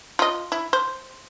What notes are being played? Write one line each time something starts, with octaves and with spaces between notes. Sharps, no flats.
F4 D#5
E4
C5